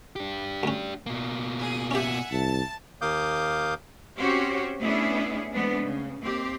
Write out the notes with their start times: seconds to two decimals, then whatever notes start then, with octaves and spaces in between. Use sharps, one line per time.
0.16 D4 G4
0.63 D2 C#4
1.06 B2 A#3
1.60 G#4
1.91 C#4 G4 E5 F#5 G#5
2.31 C2 A5
3.02 D#2 A#3 F5 D6 D#6 G6
4.17 C4 C#4 F#4 G4 C5 C#5
4.79 A3 B3 C#4 D4 E4 G#4
5.52 E3 G#3 A3 B3 C4 D4
5.82 C#3
6.21 D#2 C4 G4